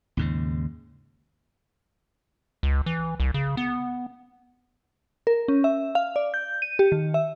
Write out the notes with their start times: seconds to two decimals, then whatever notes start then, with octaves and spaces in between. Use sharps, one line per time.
0.17 D#2 G#2 C#3
2.63 C#2
2.86 E3
3.20 C2
3.34 C#3
3.57 B3
5.27 A#4
5.48 C#4
5.64 E5
5.95 F5
6.16 D5
6.34 G6
6.62 D#7
6.79 G4
6.92 D#3
7.14 E5